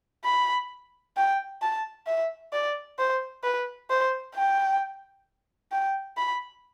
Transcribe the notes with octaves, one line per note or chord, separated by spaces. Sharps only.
B5
G5
A5
E5
D5
C5
B4
C5
G5
G5
B5